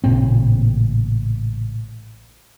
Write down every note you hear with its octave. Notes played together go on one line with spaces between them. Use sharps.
A1 A#2 C#3 C4